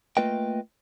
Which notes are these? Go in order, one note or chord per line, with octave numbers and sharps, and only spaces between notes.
A3 A#3 F4 B4 D#5 G5